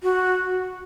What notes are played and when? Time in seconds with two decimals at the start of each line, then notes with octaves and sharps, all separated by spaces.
0.03 F#4